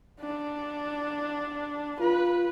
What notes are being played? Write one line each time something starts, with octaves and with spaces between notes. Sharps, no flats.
D4
F4 B4